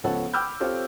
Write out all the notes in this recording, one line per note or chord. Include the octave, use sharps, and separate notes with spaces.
C#2 F3 B3 A4 C#5 F#5
G5 B5 D6 E6 F6 G6
C4 F4 G4 A4 C#5